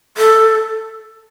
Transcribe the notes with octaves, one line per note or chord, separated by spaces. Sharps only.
A4